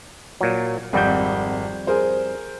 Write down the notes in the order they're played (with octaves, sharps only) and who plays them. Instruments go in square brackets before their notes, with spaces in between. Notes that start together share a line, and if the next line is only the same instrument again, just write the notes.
[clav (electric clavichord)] A#2 F#3
[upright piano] G#1 F#5 G6 [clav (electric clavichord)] F2 G3
[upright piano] G#4 A#4 C5